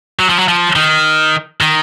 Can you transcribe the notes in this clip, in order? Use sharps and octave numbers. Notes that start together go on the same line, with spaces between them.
F#3
F3
F#3
F3
D#3
D#3